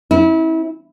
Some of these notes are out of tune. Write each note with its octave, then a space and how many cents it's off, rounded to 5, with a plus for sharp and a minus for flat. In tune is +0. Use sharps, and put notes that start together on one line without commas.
C4 +45 E4 -30